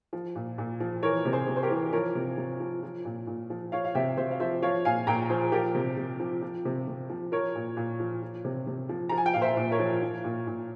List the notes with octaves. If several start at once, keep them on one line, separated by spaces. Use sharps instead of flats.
F3
A#2
A#2
F3
E3 A#4 C#5
C3
G#4 C5
C3
C5
G4 A#4
E3
F3 A#4 C#5
C3
C3
F3
F3
A#2
A#2
F3
F3 C#5 F5
F5
C3 E5 G5
C3 C5 E5
F5
F3 C5 E5
F3 C#5 F5
A#2 F5 G#5
A#2 G5 A#5
F3 G#4 C5
F3 G4 A#4
C3
C3
F3
F3
C3
C3
F3
F3 A#4 C#5
A#2
A#2
F3
F3
C3
C3
F3
F3 A#5
G#5
G5
A#2 F5
C5 E5
A#2
A#4 C#5
F3
F3
A#2
A#2